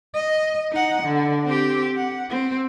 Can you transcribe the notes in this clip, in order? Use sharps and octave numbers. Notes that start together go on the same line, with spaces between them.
D#5
D#4 F#5
D3
C4 G4
F#5
C4